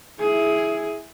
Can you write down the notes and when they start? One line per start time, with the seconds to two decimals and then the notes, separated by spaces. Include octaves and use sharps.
0.20 E4 G#4